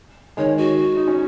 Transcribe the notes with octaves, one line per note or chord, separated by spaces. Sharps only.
D#3 G#3 C#5
F#4
D#4
C#4